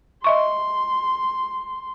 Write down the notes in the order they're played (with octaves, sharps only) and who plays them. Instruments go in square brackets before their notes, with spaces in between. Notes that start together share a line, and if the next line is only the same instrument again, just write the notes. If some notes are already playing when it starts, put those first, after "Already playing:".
[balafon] D#5 E5 C#6 [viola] C6